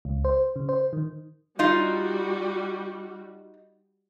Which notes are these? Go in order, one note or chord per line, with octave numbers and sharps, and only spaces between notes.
C#2
C5
C#3
C5
D#3
G3 D#4 F4 F#4